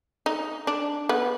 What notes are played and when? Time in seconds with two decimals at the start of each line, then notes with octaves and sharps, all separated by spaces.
0.26 D#4
0.67 D4
1.09 B3